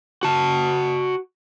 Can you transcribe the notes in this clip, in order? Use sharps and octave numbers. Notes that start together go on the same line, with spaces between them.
F#4 A5